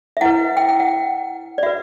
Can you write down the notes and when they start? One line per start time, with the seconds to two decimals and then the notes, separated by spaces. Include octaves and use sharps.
0.17 E5
0.21 E4 B4 F#5
0.57 G5
0.69 G5
0.80 F#5
1.58 D5
1.63 F#4 B4 E5